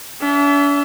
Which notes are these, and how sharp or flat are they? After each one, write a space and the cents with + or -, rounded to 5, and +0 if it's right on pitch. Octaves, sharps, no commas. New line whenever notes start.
D4 -45 E5 +15